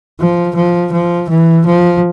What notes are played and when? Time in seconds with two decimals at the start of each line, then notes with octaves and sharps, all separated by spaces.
0.20 F3
0.55 F3
0.92 F3
1.29 E3
1.66 F3